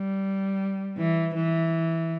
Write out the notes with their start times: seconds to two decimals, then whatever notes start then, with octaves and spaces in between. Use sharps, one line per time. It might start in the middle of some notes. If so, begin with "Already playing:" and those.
Already playing: G3
0.98 E3
1.35 E3